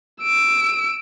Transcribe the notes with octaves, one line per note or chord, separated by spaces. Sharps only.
E6 D7